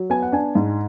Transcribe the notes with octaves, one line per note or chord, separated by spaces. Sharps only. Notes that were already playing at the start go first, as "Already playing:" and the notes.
Already playing: F#3
B3 G#5
F#5
D4 G#5
G#2